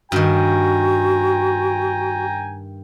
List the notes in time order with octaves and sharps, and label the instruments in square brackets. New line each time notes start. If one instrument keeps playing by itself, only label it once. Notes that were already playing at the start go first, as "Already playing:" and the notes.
[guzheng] G2 D#3 [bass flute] F#4 [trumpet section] G5 G#5 A#5